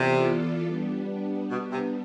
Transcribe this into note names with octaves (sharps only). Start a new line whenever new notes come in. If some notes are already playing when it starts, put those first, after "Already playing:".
Already playing: C3 E3 B3 F4 A4 D5
G3 B3 D4
B2
C3